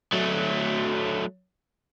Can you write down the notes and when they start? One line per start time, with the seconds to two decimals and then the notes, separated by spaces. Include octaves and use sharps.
0.14 F#3 A3